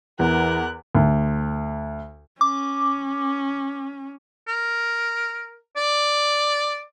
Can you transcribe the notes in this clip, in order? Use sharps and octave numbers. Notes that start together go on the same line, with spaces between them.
E2 E3 A#4 F#6
D2
C#4 D6
A#4
D5